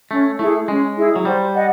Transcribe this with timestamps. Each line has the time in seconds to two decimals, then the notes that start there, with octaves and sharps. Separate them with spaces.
0.10 A3 C#4
0.38 A3 E4 G#4
0.68 G#3 C#4
0.96 E4 G#4
1.16 F#3
1.25 G3 C5
1.54 D#5 F#5